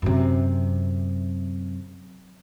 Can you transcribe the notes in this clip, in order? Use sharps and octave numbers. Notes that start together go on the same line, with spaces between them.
F#2 C3